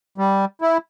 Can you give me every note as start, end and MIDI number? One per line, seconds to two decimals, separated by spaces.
0.18 0.45 55
0.62 0.78 64